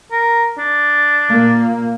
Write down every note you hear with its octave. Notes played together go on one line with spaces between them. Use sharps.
A#4
D4
A#2 A#3